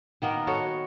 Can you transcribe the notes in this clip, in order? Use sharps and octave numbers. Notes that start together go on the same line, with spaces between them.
D#3 A#3 B3 A#4
F#4 A4 C#5 D#5